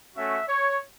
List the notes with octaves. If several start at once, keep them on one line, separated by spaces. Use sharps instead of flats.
A3 C#4 F#4 E5
C#5